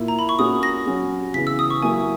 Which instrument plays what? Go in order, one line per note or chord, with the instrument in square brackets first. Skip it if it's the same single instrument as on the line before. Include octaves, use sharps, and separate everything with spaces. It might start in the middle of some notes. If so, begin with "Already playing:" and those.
Already playing: [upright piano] A#2 A#3 E4
[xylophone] A#5
B5
C#6
[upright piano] A#2 A#3 C#4 F#4 [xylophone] D#6
[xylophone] A#6
[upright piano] F#3 C#4 F#4
[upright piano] C#3 E3 B3 [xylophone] B6
[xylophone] E6
D#6
C#6
[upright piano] F#3 A#3 E4 [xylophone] G#5